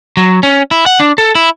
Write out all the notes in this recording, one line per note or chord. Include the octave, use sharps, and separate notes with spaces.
F#3
C#4
E4
F#5
D4
A4
E4